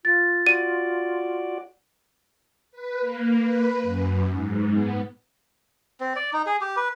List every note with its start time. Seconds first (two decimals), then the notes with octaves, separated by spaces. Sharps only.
0.05 F4 A6
0.47 F#4 D5 D#7
2.72 B4
3.01 A#3
3.43 B4
3.82 F#2
4.31 G#2
4.73 B3
6.00 C4
6.16 D5
6.33 D#4
6.46 G#4
6.61 G4
6.77 B4